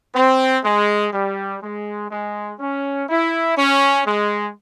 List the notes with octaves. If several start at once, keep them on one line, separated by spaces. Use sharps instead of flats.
C4
G#3
G3
G#3
G#3
C#4
E4
C#4
G#3